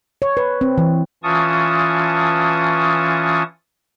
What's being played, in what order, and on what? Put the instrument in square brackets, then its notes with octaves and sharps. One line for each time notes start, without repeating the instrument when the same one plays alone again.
[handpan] C#5
B4
C4
E3
[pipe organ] E3 C#4 F4 A5 C#6 D#6